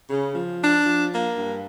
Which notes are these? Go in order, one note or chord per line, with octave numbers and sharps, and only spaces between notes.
C#3
F3
D4
F3
A#3
G2